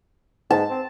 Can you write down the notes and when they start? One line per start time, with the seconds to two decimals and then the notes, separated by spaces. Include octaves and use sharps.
0.51 G#2 A5
0.70 C4